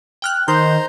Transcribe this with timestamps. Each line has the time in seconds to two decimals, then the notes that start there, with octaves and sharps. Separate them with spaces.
0.22 G5 F6 F#6
0.48 D#3 C5 A#5 C6 G6